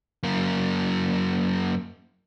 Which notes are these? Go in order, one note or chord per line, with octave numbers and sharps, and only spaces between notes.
F#2 A#3